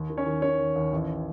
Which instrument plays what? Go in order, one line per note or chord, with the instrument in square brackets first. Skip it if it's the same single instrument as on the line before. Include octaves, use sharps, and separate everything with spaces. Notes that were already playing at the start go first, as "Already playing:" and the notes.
Already playing: [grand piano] D#2
D#3
C#4 C#5
D#3
D#3 C#4 C#5
D#2
D#2
A1